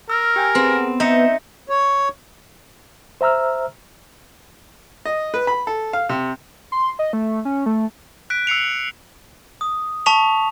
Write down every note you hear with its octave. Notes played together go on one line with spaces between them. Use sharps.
A#4 E6 F6
G4 G5 G#5
B3 C4 G#4
D#4 E5 G6 A#6 C#7
C#5
C5 E5 A#5 E6 F6
D#5
B4
B5
A4
F5
C3
C6
D#5
A3
C#4
A3
F#6 B6 D7
E6 C7 C#7 F7
D#6
A5 C#6 B6 F7